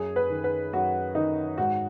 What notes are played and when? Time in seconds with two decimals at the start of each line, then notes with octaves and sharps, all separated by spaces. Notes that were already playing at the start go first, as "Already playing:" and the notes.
Already playing: F#2 G#4
0.16 B4
0.30 D#3
0.44 B4
0.73 F#2 F#4
1.15 D#3 D#4
1.58 G#2 F#4